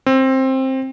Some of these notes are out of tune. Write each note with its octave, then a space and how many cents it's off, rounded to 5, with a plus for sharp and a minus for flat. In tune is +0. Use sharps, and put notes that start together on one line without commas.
C4 +15